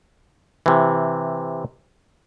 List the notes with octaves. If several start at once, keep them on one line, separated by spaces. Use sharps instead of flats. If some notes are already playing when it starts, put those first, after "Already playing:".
C3 E3